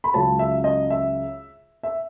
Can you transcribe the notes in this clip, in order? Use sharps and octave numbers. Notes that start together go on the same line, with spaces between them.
B5
C#2 C#3 F#3 C#4 A5
E5
D#5
E5
E5